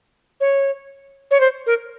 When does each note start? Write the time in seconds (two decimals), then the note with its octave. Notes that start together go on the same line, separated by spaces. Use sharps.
0.41 C#5
1.31 C#5
1.40 C5
1.66 A#4